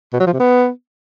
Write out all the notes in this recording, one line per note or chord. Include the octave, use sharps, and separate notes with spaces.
B2
F#3
F3
C3
B3